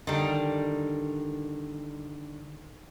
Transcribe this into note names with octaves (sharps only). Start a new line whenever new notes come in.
D3 D#3 G3